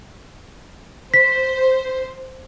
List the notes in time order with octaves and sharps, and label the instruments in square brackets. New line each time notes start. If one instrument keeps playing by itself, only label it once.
[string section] C5 [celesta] B6